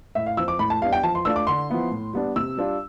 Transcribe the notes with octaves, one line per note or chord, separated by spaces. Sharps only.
A2 E5
F5
F3 C4 E6
D6
A2 B5
A5
G3 B3 D4 F5
G5
F3 A5
C6
A3 D4 F4 E6
D6
D3 C6
F3 B3 E4
A2
G3 B3 D4
C3 E6
G3 D4 F4